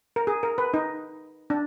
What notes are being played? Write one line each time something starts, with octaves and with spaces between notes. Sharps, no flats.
A#4
G#4
A#4
B4
D#4
D4